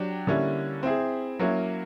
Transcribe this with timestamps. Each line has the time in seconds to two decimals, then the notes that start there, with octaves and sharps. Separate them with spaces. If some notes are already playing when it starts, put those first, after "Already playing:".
Already playing: F#3 D4 G4
0.27 D3 G3 A#3 C#4 E4
0.83 C4 E4 G#4
1.39 F#3 A#3 C#4 E4